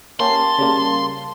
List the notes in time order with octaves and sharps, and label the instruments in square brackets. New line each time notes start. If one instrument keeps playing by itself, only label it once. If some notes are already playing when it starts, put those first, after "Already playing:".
[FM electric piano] A#3 C#4 G4 [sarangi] A5 [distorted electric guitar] C6
[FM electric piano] C#3 G3 A#3